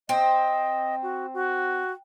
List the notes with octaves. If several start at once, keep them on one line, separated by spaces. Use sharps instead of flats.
C4 D#5
F#4
F#4